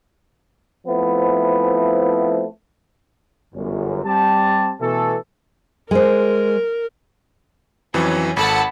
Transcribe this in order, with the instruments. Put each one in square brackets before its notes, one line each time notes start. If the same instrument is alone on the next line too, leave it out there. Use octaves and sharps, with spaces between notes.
[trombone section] F3 A3 B3 C4 E4
[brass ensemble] G1 F#2
G3 C4 G4 A5
B2 E3 A3 A4
[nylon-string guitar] G#3 C5 [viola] A#4
[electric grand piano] F2 E3 F#3 [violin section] C#4
[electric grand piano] G#1 A4 [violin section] F#5 A5 B5